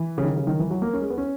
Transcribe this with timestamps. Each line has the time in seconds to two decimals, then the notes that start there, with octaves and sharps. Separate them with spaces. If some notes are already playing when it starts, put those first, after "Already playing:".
Already playing: E3
0.18 C#3
0.24 D#3
0.36 C#3
0.47 D#3
0.59 E3
0.71 F#3
0.82 A#3
0.93 C#4
1.01 G#3
1.10 B3
1.18 C#4